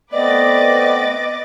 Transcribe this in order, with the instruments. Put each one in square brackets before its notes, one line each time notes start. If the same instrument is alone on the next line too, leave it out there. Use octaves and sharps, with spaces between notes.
[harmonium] A3 B3 C4 [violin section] B4 D6 A6 [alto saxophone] D5 [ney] D#5